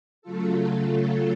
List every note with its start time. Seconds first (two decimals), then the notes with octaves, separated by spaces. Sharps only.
0.22 C#3 F#3 A3 F4 A4